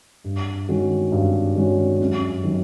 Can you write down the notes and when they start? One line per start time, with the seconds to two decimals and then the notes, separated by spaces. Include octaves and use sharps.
0.24 G2
0.68 D#3 G#3 C#4 F#4
1.12 G2
1.56 D#3 G#3 C#4 F#4
2.01 F#2
2.44 D#3 F#3